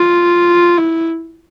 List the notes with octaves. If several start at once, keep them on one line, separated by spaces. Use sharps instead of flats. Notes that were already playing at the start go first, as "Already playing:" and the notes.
Already playing: F4
E4